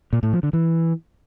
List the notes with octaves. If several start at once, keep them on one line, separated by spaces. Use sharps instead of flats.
A#2
A2
F3
D3
E3